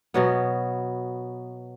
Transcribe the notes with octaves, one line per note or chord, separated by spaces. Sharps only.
B2 F#3 B3